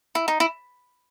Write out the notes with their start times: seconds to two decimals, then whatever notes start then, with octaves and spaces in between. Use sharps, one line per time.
0.15 E4
0.28 D#4
0.40 E4